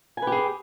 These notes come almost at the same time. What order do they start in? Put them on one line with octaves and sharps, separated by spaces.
G#5 B4 G4 G#4